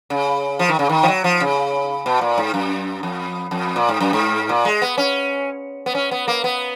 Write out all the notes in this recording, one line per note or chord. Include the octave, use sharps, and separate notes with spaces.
C#3
F3
D#3
C#3
D#3
F3
F#3
F3
C#3
B2
A#2
G#2
F#2
F2
F2
A#2
G#2
F#2
G#2
A#2
G#3
B3
C#4
B3
C#4
B3
A#3
B3